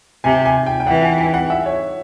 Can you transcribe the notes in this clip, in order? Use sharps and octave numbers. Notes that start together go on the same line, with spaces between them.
C3 G#5
G#5
G5
G5
E3 F#5
G#5
G#5
F#5
E5
C#5